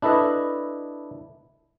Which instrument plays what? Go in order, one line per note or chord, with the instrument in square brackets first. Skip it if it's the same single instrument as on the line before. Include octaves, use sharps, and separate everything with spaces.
[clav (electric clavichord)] D4 E4 A4 B4 D#5